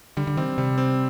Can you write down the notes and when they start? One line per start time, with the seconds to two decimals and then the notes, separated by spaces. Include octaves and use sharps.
0.17 D3 G3
0.27 D3
0.37 D#3 C4
0.58 C3 G3
0.78 C4